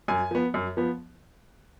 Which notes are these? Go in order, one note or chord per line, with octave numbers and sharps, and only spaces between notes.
F#2 G#5
F3 B3
F#2
F3 B3